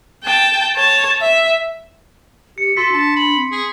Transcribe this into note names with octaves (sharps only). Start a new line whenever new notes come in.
G5 A5
C#5 A5
E5
G4 C#7
F#4 A4 C6 B6
D4 A5
B5
C4
G#4